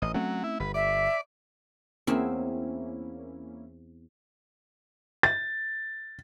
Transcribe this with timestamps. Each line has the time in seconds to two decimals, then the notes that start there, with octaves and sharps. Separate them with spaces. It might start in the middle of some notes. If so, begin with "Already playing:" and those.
0.02 A1 D#5
0.14 F#3 A3 C4 C#4
0.44 E4
0.60 G1 B4
0.74 D5 E5
2.07 E2 A#3 C4 C#4 E4 E5
5.23 A6